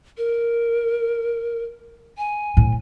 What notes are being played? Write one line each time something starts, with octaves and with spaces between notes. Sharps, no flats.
A#4
G#5
A2